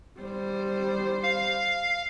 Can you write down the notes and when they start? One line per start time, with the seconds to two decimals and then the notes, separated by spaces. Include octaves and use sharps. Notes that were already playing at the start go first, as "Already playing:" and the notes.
0.21 G3 C5
1.23 F5